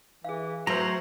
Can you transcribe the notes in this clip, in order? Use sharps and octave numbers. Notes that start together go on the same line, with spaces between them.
E3 G#4 F5
F#3 A3 B4 C5 A#5 C6